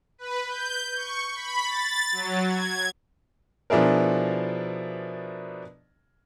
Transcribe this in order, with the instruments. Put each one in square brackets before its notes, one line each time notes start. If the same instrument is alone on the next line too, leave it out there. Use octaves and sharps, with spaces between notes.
[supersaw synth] B4
G6
C#6
B5
A6
F#3
G#6
[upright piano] B2 F3 D4 E4 G#4 A#4